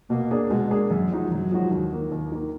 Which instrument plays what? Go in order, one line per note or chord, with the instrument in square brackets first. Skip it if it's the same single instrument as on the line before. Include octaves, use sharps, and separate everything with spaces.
[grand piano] B2 [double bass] A#3
[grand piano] A#3 D4 G#4
[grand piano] B2 [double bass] G#3
[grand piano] A#3 D4 G#4
F#2
F3 G#3 D#4 F#4
[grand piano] F#2 [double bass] F#3
[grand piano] F3 G#3 D#4 F#4
D#2
D#3 A#3
D#2
D#3 A#3